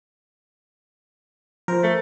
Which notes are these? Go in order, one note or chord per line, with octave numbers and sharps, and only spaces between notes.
F3 A#4 C5
A3